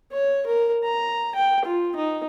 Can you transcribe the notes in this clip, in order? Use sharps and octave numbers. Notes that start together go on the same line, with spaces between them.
C#5
A#4
A#5
G5
F4
D#4